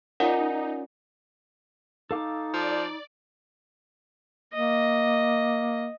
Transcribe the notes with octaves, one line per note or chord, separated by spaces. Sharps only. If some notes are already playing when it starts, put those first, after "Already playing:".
C#4 D#4 F4 A#4 D5 F#5 G#5
D#4 A4 F5 D6
F3 D5
A#3 D#5